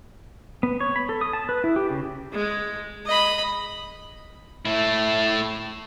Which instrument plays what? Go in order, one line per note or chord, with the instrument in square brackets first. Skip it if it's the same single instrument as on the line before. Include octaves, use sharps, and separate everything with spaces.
[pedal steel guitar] B3
C#5
B5
A4
D#6
A5
B4
E4
G4
C#3
[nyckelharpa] G#3
D#5 B5
[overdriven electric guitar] A3 E4